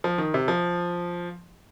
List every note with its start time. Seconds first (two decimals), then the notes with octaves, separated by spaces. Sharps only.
0.04 F3
0.18 D#3
0.34 C3
0.48 F3